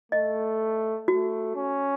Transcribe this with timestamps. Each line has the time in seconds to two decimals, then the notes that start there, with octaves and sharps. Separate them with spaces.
0.12 A3 D#5
1.08 A3 F#4
1.56 C#4